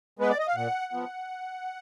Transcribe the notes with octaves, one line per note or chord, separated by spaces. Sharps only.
G#3 B3 B4
D5
D#5
F5
A#2 F#5
F3 B3